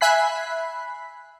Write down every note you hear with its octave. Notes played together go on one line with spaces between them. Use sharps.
E5 G#5 B5 F#6 B6 C7